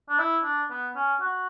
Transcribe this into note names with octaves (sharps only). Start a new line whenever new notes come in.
D4
E4
D4
B3
C#4
F#4